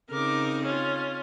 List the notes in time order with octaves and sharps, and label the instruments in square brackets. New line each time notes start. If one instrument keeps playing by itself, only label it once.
[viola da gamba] C#3 C4 D#4 [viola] A#4 D6
[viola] C#4 F4